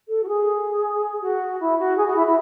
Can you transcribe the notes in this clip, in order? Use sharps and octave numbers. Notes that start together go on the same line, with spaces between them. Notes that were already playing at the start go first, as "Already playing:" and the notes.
A4
F#4
G#4
F#4
E4
F#4
G#4
F#4
E4
E4